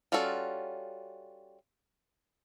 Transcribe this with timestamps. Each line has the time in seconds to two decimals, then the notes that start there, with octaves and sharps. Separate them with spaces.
0.12 G3 C#4 F4 F#4 A4